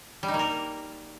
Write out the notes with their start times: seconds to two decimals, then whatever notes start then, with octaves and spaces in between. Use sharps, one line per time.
0.23 G3
0.28 D#4
0.34 A#3
0.39 A#4